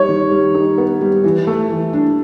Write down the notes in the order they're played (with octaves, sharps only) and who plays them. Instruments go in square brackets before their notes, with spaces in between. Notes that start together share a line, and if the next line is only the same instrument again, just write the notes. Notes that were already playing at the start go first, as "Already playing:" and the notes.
Already playing: [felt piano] G3 D#4 [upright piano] C#5
[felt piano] D#3
G3
D#4
B3
G3
E3
A3
E3
D4